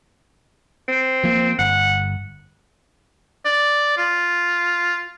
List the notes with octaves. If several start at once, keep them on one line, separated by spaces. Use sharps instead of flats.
C4
F3 A#3
G1 F#5
D5
F4